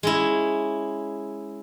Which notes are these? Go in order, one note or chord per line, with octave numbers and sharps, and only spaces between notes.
G#3 C#4 E4